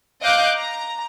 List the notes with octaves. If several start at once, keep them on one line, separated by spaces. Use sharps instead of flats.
D#5 F5 D6 F#6 G6
A#5